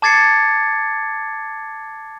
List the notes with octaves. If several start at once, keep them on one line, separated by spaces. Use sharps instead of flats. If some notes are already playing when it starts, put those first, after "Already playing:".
A5 D6 G#6 A6 C7 C#7